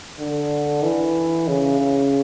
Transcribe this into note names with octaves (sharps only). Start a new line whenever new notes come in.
D3
E3
C#3
C#3